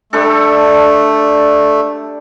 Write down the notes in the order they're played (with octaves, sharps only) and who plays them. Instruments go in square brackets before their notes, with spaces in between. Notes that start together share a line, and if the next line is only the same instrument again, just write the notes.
[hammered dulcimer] G3 D4 A4 [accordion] A3